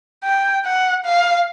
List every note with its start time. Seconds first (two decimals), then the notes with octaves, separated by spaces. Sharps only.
0.23 G5
0.65 F#5
1.05 F5